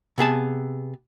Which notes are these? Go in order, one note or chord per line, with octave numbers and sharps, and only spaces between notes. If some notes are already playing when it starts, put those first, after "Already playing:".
C3 B3 G#4 A5